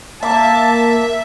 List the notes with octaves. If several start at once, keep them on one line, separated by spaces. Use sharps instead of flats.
A#3 E5 A5